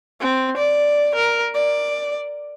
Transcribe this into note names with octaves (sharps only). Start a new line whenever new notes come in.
C4
D5
A#4
D5